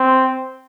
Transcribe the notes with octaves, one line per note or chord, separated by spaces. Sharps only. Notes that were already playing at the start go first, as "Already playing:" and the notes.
Already playing: C4